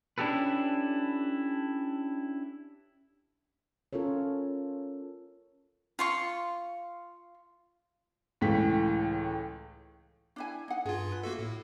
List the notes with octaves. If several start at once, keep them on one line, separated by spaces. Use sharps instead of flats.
C#4 D4 E4 G4 A4 B4
C#4 F4 A4 A#4 C#5
F4 C6 C#6
C#2 A2 E3 G5 B6
D4 E4 G#5
D#4 F#5
G2 F4 G#4
B4
A#3 F#4 A4 E5
A2